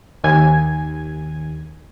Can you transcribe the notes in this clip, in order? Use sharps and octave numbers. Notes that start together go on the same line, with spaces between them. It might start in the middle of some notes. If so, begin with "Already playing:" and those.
D#2 G#5 G#6